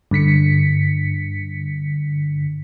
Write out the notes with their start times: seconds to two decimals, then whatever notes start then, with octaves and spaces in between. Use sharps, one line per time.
0.11 G2 D3 B6 C#7